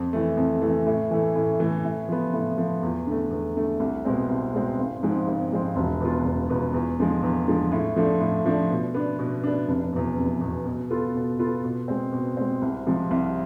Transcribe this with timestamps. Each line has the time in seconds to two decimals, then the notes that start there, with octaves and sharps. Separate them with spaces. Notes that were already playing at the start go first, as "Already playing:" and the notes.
Already playing: F2
0.13 E3 A3
0.37 F2
0.62 E3 A3
0.86 A2
1.11 E3 A3
1.36 A2
1.60 E3 A3
1.85 A2
2.09 F3 B3
2.33 A2
2.58 F3 B3
2.83 E2
3.07 D3 A3
3.31 E2
3.56 D3 A3
3.80 C2
4.05 B2 G#3 C4
4.29 C2
4.53 B2 G#3 C4
4.79 G#1
5.03 G#2 F3 G#3 C4
5.27 G#1
5.52 G#2 F3 G#3 C4
5.76 E1
6.01 E2 B2 B3 F4
6.25 E1
6.49 E2 B2 B3 F4
6.74 E2
6.99 D3 F3 G#3
7.23 E2
7.47 D3 F3 G#3
7.72 A2
7.96 F3 A3 D4
8.21 A2
8.46 F3 A3 D4
8.70 B2
8.94 B3 D4
9.19 B2
9.44 B3 D4
9.68 F1
9.93 E2 B2
10.17 F1
10.41 E2 B2
10.66 B2
10.90 B3 F4 A4
11.15 B2
11.39 B3 F4 A4
11.64 B2
11.88 G#3 C4
12.13 B2
12.37 G#3 C4
12.62 C2
12.86 C3 F3 G#3
13.11 C2